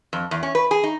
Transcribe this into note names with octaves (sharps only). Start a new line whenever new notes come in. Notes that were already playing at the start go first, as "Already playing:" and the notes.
F2
E2
C#4
B4
G#4
D#4